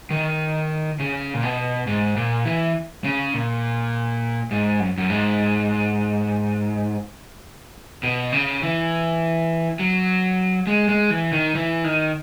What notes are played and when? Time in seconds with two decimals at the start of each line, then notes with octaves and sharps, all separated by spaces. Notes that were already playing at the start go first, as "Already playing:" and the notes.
0.10 D#3
1.00 C#3
1.34 A#2
1.43 B2
1.87 G#2
2.16 A#2
2.45 E3
3.04 C#3
3.34 A#2
4.51 G#2
4.80 F#2
4.98 F#2
5.10 G#2
8.03 B2
8.32 C#3
8.62 E3
9.79 F#3
10.67 G#3
10.89 G#3
11.10 E3
11.32 D#3
11.55 E3
11.84 D#3